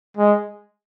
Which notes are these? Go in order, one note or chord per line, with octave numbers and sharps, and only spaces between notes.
G#3